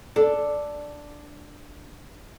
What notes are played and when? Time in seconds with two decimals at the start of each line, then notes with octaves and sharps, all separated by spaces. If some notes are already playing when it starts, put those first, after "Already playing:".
0.16 D4 A4